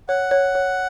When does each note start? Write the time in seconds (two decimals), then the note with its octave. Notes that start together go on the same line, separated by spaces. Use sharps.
0.09 C#5 F#5
0.31 C#5
0.55 C#5